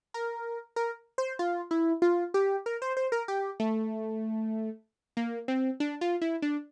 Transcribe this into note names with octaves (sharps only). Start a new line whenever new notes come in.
A#4
A#4
C5
F4
E4
F4
G4
A#4
C5
C5
A#4
G4
A3
A#3
C4
D4
F4
E4
D4